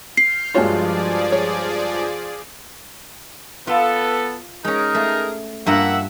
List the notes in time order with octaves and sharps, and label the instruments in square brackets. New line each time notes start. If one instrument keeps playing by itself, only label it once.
[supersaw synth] F6 G6 [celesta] C7
[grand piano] G2 G#3 F4 [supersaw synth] F3 G#4 D5 [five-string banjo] F#4 C#5
[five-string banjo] C#5
[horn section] B3 A4 [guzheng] F4
[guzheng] G#3 C#4 [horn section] D#4 G#4 A#4
[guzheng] A3
[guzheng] G2 F4 A#5 [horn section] A#3 E5 F#5